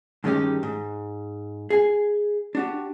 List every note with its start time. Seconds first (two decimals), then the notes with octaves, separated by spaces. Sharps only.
0.24 G2 D#3 G#3 C#4 D#4 G4
0.63 G#2
1.70 G#4 G#5
2.55 D4 F#4 G4